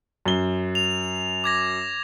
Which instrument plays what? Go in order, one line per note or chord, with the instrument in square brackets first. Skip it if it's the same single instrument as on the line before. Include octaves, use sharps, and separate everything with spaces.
[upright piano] F#2 G7
[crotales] F7
D6 G#6 A#6